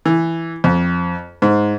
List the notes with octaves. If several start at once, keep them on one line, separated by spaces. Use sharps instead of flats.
E3
F2
G#2